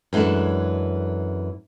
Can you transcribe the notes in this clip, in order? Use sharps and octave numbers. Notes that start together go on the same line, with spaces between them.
F#2 E3 G#3 D4 A4